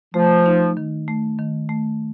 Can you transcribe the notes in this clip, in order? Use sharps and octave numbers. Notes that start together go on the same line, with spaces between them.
F3 A3
D#4
D#3
A3
D#3
A3